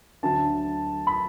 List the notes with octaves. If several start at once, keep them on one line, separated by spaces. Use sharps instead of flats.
D2 D3 F#3 A5
B5